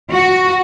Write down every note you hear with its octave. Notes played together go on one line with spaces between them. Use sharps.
F#4